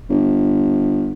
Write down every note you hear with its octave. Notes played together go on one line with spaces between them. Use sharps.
G1